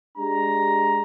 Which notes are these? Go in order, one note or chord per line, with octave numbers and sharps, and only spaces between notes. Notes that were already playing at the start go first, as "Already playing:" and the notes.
G#3 D4 G4 A#5